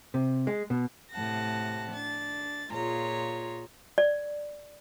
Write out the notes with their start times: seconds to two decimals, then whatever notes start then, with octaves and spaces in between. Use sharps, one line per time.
0.14 C3
0.47 G#3
0.70 B2
1.12 A2 C3 F#5 A5 A#6
1.92 D4 A6
2.70 A#2 F4 G#4 C#5 A#5
3.98 D5